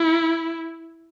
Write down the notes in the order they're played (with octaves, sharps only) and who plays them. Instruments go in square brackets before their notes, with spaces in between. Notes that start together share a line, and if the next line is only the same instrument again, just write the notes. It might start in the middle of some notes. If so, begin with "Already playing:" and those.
Already playing: [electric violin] E4